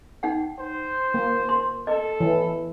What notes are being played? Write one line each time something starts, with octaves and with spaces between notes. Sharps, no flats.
D#4 F#5 G5
C5
A#3
C6
A4 D#5
E3